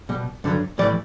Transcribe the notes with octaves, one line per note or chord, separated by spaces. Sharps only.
B2 G3
G2 D3 F#3
A2 E3 G3 D5